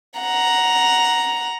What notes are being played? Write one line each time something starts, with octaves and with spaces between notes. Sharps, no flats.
F#5 A#5